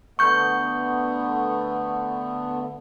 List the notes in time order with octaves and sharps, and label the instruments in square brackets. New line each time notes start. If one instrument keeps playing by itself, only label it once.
[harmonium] D3 A3 B3 [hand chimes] C#6 G6